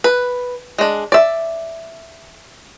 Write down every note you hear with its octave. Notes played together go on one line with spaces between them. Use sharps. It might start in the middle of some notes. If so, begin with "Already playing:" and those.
B4
G#3 D4
D5 E5